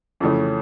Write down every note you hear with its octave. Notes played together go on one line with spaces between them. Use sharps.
F2 C#3 E3 A3 C#4